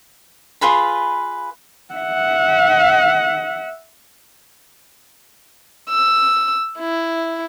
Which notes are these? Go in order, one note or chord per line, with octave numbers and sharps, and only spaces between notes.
F4 G#4 B4 B5
E5 F#5
E6
E4